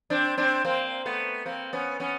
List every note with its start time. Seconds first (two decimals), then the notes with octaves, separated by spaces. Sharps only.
0.10 C4 D4
0.38 C4 D4
0.65 A#3 C4
1.06 A3 B3
1.46 A#3 C4
1.73 B3 C#4
2.00 B3 C#4